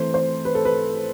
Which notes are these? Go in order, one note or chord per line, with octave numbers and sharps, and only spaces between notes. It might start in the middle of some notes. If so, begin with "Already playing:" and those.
Already playing: E3 A3 C4 C5
C5
B4
A4
B4